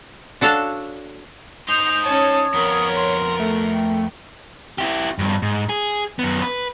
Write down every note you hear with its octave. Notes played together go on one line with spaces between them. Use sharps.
D4 F#4 A4 C#5 F5 A5
D#4 C5 D#6 G6 F7
C#4 C#5 A5
F2 B3 A#4
C6
A3 A4
G5
E4 G4
G2 F3
G#2
G#4
F#2 B3
B4